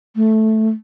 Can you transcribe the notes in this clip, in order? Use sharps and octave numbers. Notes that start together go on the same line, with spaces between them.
A3